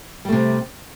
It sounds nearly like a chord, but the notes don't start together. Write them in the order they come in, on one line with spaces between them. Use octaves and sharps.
G3 A3 C3